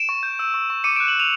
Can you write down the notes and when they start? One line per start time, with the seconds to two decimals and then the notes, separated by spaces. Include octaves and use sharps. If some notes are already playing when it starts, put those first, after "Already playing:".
Already playing: D7 E7
0.09 C#6
0.23 G6
0.39 E6
0.54 C#6
0.70 C#6
0.84 D6 C#7 D#7
0.96 F#6 D7 E7
1.07 E7 F#7
1.16 D6 D#7 F7